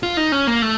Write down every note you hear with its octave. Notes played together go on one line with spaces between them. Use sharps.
F4
D#4
C#4
A#3
A3